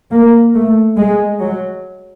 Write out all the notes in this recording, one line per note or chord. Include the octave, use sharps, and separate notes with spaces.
A#3
A3
G#3
F#3